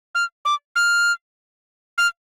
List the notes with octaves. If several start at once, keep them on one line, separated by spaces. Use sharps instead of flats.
F6
D6
F6
F6